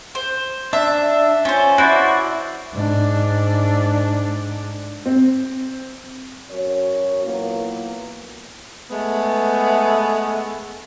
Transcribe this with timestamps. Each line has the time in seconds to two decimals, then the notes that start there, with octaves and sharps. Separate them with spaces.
0.15 C5
0.73 D4 E5
1.45 C#4 F4 C5
1.78 E4 F#4 C5 D5
2.72 G#2 D4
5.06 C4
6.50 F#2 F#4 C#5
7.24 A#2 E3 F#3 A#3 B3
8.90 G#3 A3 B3